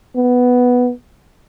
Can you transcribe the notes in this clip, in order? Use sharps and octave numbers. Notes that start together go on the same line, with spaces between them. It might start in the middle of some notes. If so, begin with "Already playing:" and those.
B3